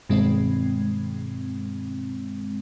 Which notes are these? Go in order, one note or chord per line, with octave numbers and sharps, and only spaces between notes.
G2 B2 D#3 G#3 C4